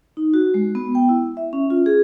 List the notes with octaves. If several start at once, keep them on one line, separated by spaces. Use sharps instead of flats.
D#4
F#4
G#3
B3
G5
E4
E5
C#4
F4
G#4